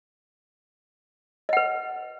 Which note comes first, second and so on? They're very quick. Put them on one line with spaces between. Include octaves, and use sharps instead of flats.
D#5 F#5 B4